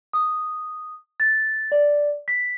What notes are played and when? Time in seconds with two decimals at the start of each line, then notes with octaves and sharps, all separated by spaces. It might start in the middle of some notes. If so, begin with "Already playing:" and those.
0.13 D#6
1.20 A6
1.72 D5
2.28 B6